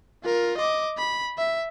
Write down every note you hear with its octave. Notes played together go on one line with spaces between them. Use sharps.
F4 A#4
D#5 D6
B5
E5